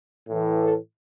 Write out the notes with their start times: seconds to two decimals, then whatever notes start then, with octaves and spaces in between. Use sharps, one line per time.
0.29 A2 E3
0.63 A4